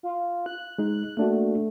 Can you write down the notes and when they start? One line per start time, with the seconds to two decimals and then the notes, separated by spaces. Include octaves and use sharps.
0.03 F4
0.46 F#6
0.78 G#3 D#4
1.17 A3 A#3 D4 F#4